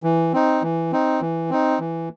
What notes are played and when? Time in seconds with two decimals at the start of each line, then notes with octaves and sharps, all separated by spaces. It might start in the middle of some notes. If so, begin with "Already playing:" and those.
0.03 E3
0.33 C4 D#4
0.62 E3
0.92 C4 D#4
1.21 E3
1.50 C4 D#4
1.80 E3